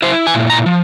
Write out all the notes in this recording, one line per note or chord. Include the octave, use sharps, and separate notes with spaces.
E4 C5
G#5
A#2
A#5
F3